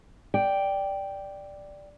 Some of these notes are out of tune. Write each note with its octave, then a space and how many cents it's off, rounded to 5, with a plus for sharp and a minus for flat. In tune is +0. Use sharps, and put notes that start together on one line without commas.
D5 +0 G5 +0